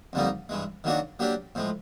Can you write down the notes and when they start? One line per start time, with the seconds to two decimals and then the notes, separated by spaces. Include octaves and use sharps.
0.13 F2 D3 G3 A#3 D#4
0.49 G2 E3 G#3
0.84 D#3 F#3 A#3 D4 F#4
1.19 F#3 A#3 D4 G4
1.55 A2 F3 G#3